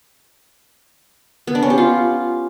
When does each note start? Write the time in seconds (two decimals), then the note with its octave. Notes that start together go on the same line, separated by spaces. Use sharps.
1.47 B3
1.55 D4
1.63 C#4
1.70 G4
1.78 F4